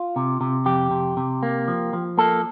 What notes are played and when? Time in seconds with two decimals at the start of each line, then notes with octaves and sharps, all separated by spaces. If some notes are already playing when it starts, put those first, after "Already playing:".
Already playing: F4
0.16 C3
0.41 C3
0.66 F2 G4
0.91 C3
1.17 C3
1.43 A#3
1.68 F3
1.93 F3
2.18 A#3 A4